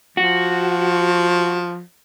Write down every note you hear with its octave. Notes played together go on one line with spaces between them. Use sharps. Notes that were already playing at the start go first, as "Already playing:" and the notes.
F3 F#4